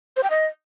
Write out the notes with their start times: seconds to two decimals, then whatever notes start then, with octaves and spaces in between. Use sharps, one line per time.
0.17 C5
0.23 G5
0.30 D#5